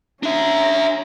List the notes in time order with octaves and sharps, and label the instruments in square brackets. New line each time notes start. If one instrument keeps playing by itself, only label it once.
[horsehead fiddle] C#4 A#5 [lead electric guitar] D4 E5